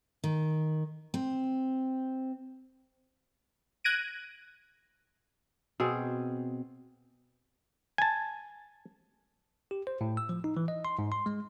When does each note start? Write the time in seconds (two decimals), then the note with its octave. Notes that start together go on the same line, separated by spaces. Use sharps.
0.24 D#3
1.14 C4
3.84 F#6 G#6 A#6 D7 D#7
5.80 B2 C4 G#4
7.98 G#5 A5
9.71 G4
9.87 C5
10.01 A2
10.17 E6
10.29 F3
10.44 D#4
10.57 E3
10.68 D#5
10.85 C6
10.99 G#2
11.12 C6
11.26 G#3